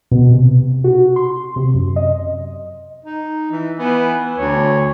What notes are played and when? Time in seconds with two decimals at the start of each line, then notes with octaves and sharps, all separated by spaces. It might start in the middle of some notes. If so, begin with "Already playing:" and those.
0.11 B2
0.31 C3
0.84 F#4
1.16 C6
1.56 C3
1.74 F#2
1.96 D#5
3.05 D#4
3.51 E3
3.79 E3 B3
4.38 D2 C#5